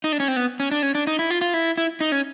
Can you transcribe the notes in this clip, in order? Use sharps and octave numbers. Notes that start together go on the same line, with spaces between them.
D#4
D4
C#4
C4
B3
C#4
D4
C#4
D4
D#4
E4
F4
F4
E4
E4
D#4
C#4